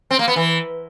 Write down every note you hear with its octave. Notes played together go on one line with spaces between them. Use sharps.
C4
A#3
B3
E3